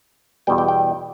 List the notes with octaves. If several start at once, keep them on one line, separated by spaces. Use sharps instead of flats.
E2 B2 G3 G5
G5
G5